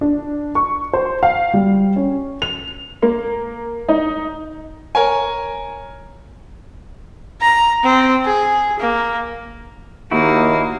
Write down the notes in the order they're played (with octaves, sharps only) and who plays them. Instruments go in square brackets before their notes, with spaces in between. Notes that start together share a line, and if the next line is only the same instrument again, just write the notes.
[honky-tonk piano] D4
C#6
C5
F5
G3
C#4
F7
A#3
D#4
[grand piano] A#4 C#5 G#5
[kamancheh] A#5
C4
G#4
A#3
[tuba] D#2 [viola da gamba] A#3 [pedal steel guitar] D#4 E4 F#4